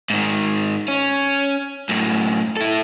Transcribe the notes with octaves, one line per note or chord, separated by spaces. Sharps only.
G#2 D#3
C#4
F#2 A2
E4 A4